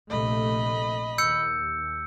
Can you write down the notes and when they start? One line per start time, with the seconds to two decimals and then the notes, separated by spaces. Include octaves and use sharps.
0.10 A#1 C3 A3 D#5 B5
1.18 D#2 E6 G6 C#7